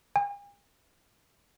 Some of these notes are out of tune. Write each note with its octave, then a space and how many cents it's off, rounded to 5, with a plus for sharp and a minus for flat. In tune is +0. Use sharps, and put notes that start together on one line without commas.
G#5 -45